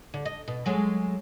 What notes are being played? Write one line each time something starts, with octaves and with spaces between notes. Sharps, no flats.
D3
D#5
B2
F#3 G#3 A3